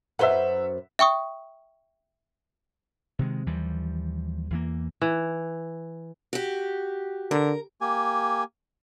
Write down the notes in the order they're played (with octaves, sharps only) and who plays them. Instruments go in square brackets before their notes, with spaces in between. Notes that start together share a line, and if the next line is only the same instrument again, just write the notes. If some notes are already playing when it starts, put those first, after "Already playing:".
[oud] F#2 B4 C5 [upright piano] E5 F#5
[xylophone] E5 G5 C#6 D#6
[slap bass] C3 D#3 G#3
D#2 E3 F3 G3
E2 E3 A#3
[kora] E3
[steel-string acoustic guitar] F#4 G4
[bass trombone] D3 [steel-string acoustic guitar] A#4
[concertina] A#3 G4 G#5